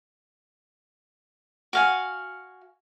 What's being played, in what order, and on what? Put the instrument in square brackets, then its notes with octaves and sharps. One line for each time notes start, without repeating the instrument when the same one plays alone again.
[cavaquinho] F#4 F5 G#5